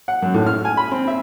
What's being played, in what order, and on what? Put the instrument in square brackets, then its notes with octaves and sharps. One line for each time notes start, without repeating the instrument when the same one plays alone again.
[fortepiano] F#5
F#2
A2
F6
G#5
B5
C4
E5